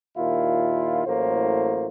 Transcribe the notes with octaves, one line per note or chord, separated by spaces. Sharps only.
D#2 A#2 E4 F4
A1 A2 F#3 A#3 C5